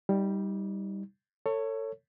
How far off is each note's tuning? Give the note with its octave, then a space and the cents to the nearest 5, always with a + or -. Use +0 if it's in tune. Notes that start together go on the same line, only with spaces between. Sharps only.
G3 +0 D#4 +25
A4 +30 C#5 +0